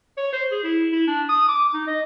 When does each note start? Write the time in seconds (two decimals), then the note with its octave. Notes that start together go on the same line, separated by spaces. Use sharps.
0.17 C#5
0.33 C5
0.51 G#4
0.64 E4
0.92 E4
1.07 D4
1.29 D#6
1.49 D6
1.74 D#4
1.87 D#5